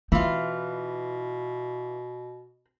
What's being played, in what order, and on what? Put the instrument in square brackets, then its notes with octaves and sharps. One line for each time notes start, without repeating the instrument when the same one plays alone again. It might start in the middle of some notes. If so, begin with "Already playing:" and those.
[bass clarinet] B2 [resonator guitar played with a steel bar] E3 F4 [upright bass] C4